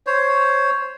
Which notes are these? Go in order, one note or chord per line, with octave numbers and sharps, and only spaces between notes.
C5 C#5